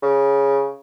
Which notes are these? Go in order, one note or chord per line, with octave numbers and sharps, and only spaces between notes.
C#3